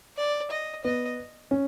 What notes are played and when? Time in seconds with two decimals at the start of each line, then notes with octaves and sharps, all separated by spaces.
0.17 D5
0.51 D#5
0.84 B3 D#5
1.51 C#4